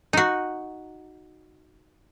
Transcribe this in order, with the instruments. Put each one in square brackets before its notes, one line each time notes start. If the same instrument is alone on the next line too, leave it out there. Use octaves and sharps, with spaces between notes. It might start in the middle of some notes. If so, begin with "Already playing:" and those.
[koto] D#4 F#4